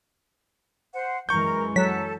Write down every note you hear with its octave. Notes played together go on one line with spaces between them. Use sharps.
C5 F#5
F#2 E3 G#3 A#4 C#6 G6
F#3 A4 A5 B6